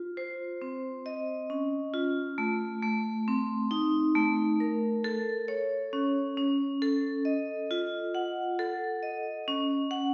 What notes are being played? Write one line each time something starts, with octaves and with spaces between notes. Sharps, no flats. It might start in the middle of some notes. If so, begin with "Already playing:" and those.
Already playing: F4
C5
C4
D#5
C#4
F4
A3
A3
C4
D#4
A3
A#4
A4
C#5
C#4
C#4
A4
D#5
F4
F#5
A4
D#5
C#4
F#5